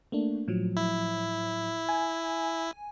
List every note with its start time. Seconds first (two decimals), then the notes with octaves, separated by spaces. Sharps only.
0.12 A3 A#3 D4
0.48 A2 F3 F#3
0.76 E4
1.89 G#5